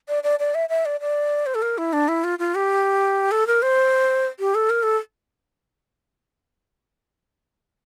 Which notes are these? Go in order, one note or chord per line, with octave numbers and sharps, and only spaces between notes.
D5
D5
D5
E5
E5
D5
D5
C5
A4
A#4
E4
D4
E4
F4
F4
G4
A4
A#4
C5
G4
A4
A#4
A4